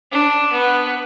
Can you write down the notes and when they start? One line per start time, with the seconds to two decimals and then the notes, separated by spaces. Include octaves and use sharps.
0.12 D4
0.52 B3